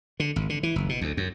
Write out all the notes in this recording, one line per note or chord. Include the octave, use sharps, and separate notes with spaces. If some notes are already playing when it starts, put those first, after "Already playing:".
D3
G#1
D3
E3
F#1
B2
D2
F#2